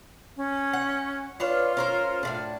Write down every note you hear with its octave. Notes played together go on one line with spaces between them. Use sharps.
C#4
F#5
D4 F4 B4 C#5
C#4 A#4 C5
A2 C3 D4